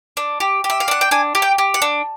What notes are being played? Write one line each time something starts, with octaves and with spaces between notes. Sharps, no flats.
D4
G4
G4
E5
F5
D4 F#5
G5
D4 G#5
G4
G5
G4
F#5
D4